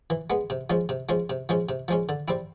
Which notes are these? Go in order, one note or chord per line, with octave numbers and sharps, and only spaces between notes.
E3
G#3 B3
C3
F3 G#3 C#4
C3
F3 G#3 C#4
C3
F3 G#3 C#4
C3
F3 G#3 C#4
D3
G3 C4 E4